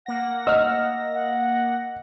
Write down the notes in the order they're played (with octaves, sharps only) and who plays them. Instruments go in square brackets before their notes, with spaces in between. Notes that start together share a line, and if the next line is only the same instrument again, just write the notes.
[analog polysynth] A#3 A#6 [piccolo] F#5
[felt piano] D#5 [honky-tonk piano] E6 F6
[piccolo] F#5